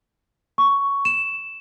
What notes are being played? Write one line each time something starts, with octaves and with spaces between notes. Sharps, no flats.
C#6
E7